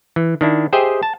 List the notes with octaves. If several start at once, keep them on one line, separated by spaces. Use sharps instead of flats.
E3
D#3 D4 E4
G4 G#4 C5 D#5 E5 G5
A5